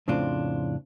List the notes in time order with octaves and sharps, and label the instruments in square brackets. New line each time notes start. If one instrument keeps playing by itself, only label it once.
[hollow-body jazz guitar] F2 A2 C#3 C4 D4 F4